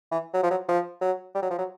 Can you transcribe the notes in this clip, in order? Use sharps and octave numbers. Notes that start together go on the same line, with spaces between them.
E3
F#3
F3
F#3
F3
F#3
G3
F#3
F3
F#3